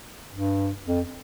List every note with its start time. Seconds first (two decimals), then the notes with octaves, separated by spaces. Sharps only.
0.32 G2
0.87 F2